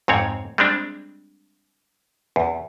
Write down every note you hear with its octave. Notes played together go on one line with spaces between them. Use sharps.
F2 G#2 C4 C#5
G3 G#3 C4 D4
E2